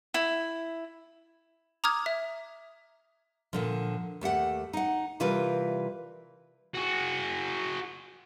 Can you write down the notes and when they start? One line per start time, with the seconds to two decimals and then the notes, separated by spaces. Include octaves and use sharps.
0.14 E4
1.84 A#5 D6 D#6 F6 G#6
2.06 E5
3.53 A#2 D3 F3
4.21 D#2 A3 G4 F#5
4.73 D#4 F#5
5.20 C3 E3 G3 F4 A#4 B4
6.75 F#4 G#4